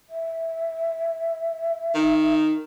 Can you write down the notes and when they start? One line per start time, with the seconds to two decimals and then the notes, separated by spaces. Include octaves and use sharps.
0.09 E5
1.94 D#3